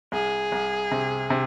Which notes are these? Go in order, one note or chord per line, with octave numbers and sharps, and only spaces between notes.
C2 G#4
C2
C3
C3